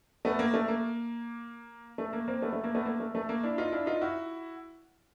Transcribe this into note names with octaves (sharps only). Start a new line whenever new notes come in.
A3 B3
A#3
A3
A#3
A3
A#3
A#3 C4
A3 B3
A3
A#3
A3 B3
A#3
A3
A3
A#3
D4 E4
D#4 F4
D4 E4
D#4 F4
E4 F#4